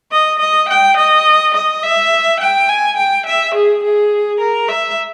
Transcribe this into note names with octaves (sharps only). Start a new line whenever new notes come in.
D#5
D#5
G5
D#5
D#5
E5
G5
G#5
G5
E5
G#4
G#4
A#4
E5